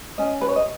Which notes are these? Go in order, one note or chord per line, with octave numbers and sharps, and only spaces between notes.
C#4 D#5
B4
C#5
D#5